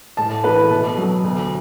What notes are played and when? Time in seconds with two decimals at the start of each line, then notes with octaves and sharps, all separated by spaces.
0.17 A2 A5
0.44 E3 A3 B4
0.70 B2 A4
0.98 F#3 B3
1.24 D2